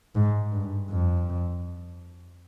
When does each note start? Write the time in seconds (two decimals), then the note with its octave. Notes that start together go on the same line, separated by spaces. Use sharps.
0.15 G#2
0.52 G2
0.90 F2